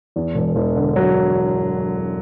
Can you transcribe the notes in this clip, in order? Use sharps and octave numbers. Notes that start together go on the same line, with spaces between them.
E2
E1
E1
D3
F#3